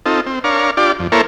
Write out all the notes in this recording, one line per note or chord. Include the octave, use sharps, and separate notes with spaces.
C4 D#4 F4 A4
C4
D4 A#4 C#5 F5
D4 F4 G4 D5
F2
A#3 E4 A4 A#4 C5 C#5